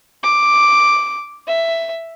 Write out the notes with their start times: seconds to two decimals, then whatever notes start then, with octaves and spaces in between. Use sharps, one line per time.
0.23 D6
1.47 E5